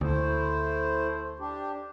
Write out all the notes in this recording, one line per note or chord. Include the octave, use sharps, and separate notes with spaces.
D2 A3 E4 C5
D4 G4